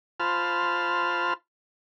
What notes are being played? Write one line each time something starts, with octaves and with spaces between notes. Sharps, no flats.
F4 C5 A5 B5 F6